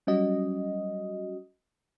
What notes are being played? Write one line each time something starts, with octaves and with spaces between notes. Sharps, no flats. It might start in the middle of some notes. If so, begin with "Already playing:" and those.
F#3 G3 C#4 F#4 D#5